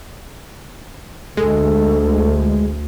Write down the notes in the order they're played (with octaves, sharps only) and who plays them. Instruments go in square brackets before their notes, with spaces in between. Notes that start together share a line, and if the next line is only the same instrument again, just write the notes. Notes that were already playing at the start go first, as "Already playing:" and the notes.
[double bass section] D2 [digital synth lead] G#3 [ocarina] A4